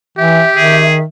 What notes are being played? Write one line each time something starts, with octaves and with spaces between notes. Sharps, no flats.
E3 G4 E5
D#3 G#4